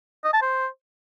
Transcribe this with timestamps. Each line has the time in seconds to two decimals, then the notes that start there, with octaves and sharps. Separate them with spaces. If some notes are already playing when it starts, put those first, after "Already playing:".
0.25 D#5
0.33 A5
0.42 C5